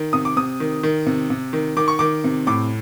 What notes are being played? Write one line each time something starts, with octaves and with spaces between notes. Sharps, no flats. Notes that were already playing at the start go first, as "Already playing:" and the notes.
Already playing: D#3
C3 D#6
D6
C3 D#6
D#3
D#3
C3
C3
D#3
D#3 D6
C#6
D#3 D6
C3
A2 D6